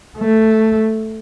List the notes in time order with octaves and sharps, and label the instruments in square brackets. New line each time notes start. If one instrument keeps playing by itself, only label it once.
[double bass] A3